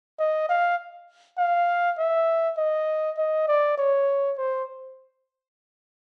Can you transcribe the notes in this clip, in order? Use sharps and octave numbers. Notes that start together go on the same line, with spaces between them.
D#5
F5
F5
E5
D#5
D#5
D5
C#5
C5